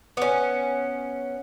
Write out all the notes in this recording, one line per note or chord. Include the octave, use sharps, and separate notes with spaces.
B3 C#4